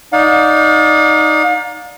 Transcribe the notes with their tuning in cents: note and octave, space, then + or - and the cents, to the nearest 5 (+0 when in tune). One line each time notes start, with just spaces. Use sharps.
D#4 +0 D5 -10 F5 +45